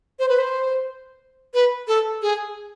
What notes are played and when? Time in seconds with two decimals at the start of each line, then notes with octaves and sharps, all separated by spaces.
0.19 C5
0.29 B4
0.39 C5
1.54 B4
1.88 A4
2.22 G#4